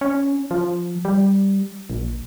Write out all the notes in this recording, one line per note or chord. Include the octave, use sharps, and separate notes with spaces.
C#4
F3
G3
A#1